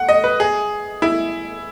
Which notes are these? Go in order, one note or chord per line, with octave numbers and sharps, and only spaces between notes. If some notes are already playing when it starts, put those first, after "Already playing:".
Already playing: F#5
D#5
B4
G#4
E4